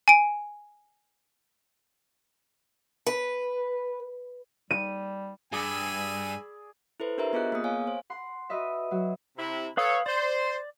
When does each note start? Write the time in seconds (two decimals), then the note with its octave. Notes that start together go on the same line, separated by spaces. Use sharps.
0.08 G#5 D7
3.07 B4
4.71 G3 D#7
5.52 G2 G#4 D5 G#5 B5 E6
7.00 E4 A4 B4 C5
7.18 D4 G4 A#4 C5 E5 A#5
7.33 B3 F4 G#4 D#5 F#6
7.52 A#3 B3 G#4 D#6
7.64 C#5 F5 G#5
7.87 C5
8.10 F#5 C6
8.50 F#4 B4 D#5 E5
8.91 F#3 F#4
9.37 C3 E4
9.77 A4 B4 C#5 F5 D#6
10.06 C5 D5